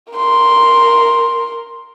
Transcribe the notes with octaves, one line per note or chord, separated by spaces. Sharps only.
A#4 C6